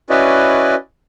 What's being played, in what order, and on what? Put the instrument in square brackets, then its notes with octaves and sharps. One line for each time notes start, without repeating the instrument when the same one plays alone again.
[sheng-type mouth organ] C#4 E4 F#4 B4 D5 D#5